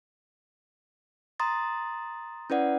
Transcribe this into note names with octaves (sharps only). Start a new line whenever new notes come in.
A#5 C6 D#6 A6
C#4 E4 B4 D5 F#5